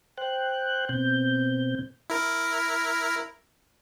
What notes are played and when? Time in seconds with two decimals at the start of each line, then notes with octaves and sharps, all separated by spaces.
0.18 C5 G5 F#6
0.89 B2 C4 G6
2.10 E4 A#4